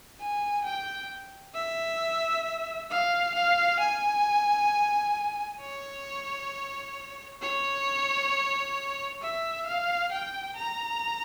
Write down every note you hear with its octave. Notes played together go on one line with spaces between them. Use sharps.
G#5
G5
E5
F5
F5
G#5
C#5
C#5
E5
F5
G5
A#5